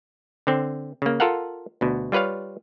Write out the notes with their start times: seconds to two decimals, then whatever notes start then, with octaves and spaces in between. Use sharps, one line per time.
0.47 D3 C4
1.02 C#3 A#3
1.20 F4 A4 A#4 F5 F#5
1.81 D2 B2
2.12 G3 F4 B4 C#5 F5